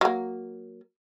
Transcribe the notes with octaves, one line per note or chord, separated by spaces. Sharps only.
F#3 A#3